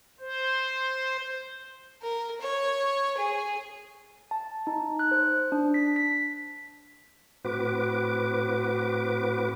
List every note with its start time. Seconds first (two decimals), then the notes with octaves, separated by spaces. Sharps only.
0.20 C5
2.02 A#4
2.41 C#5
3.17 G#4
4.31 A5
4.67 D#4
4.99 F#6
5.11 C5
5.52 D4
5.74 B6
5.96 B6
7.45 A2 C4 F#4 B4 D6